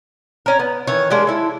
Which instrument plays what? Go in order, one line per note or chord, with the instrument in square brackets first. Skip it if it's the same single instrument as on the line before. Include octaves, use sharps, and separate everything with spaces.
[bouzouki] C#4 A#4
B3
D#3 E3 C#5
G#3 A#3 D4 G4
E4 A4